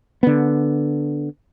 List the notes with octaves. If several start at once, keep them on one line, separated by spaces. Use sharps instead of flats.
D3 B3